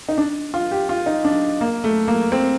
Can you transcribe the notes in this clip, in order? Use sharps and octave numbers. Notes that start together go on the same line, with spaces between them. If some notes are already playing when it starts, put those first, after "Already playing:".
D#4
D4
F4
G4
F4
D#4
D4
A#3
A3
A#3
C4